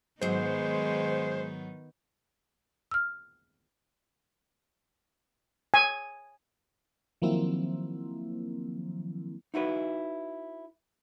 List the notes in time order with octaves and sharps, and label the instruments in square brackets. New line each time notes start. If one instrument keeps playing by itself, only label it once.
[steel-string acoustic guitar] G#2 F#3 [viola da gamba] D#3 B3 D#4 [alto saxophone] G#3 [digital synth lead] C5
[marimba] E6 F6
[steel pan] G#5
[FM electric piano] D#3 F3 F#3 A#3 C4 E4
[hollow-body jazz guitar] D#4 E4 F#4 B4